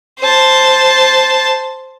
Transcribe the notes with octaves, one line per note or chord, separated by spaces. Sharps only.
C5 A5